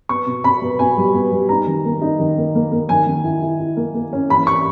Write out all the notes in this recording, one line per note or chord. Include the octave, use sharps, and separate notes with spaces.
B3 C#6
B2
B2 B5
B3
B2 G#5
G3
B3
G3
D#4 A#5
D#3
A#3
D#4
D#3
A#3
A#3
A#3
D#3 G#5
D#3
E4
E4
E4
A#3
A#3
C#4
E3 B5
C#6